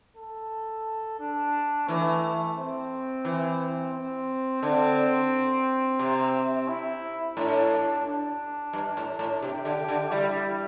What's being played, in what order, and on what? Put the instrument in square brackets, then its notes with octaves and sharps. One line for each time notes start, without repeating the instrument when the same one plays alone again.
[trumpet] A4
D4
[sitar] E3 [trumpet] A3
[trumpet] C4
[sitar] E3
[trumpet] C4
[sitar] D3 [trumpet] C4
[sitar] C3
[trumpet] E4
[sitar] A2 [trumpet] D4
[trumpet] D4
[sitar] G2
A2
A2
[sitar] C3 [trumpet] G4
[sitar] D3
D3
[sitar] G3 [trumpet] E4